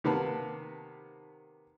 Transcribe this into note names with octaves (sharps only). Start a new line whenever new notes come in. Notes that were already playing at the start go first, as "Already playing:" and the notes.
C3 D#3 A#3 B3 B4 A5